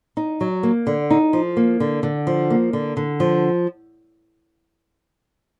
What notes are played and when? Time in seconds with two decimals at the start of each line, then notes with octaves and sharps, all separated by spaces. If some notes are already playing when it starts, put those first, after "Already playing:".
0.17 D#4
0.41 F#3
0.63 A#3
0.87 D3
1.11 D#4
1.33 F3
1.57 A#3
1.80 D3
2.03 D3
2.27 F3
2.50 A#3
2.73 D3
2.97 D3
3.20 F3